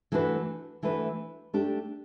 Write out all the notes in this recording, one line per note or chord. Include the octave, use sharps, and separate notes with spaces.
E3 A3 D4 F#4 B4
E3 A3 D4 F#4 B4
A3 D4 G4